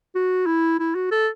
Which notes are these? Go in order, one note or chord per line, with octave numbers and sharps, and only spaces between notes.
F#4
E4
E4
F#4
A4